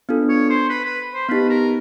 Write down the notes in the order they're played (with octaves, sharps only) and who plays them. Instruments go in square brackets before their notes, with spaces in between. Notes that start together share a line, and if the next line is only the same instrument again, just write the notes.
[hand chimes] B3 D4 F4 A4
[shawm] C#5
C5
B4
B4
C5
[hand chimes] B3 D#4 G4 [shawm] B4
[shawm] A#4